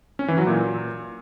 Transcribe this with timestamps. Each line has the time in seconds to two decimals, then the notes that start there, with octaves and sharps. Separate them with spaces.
0.19 C#4
0.28 E3
0.38 F#3
0.47 A#2